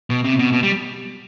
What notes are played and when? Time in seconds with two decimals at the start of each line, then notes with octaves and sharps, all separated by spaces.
0.10 B2
0.24 C3
0.39 B2
0.53 B2
0.63 G3